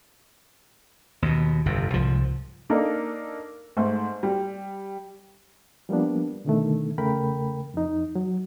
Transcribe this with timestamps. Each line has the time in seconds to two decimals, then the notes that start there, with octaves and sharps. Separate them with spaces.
1.22 D#2 B2
1.66 G1 F2 C3
1.94 C2 G#2 F3
2.70 A#3 D4 D#4 A4 A#4
3.77 G#2 A3
4.23 G3
5.89 F3 G3 A#3 B3 D4
6.45 B2 D3 D#3 A3
6.98 E2 C#3 A3 A#4 G5 B5
7.74 F2 D#4
8.15 F#3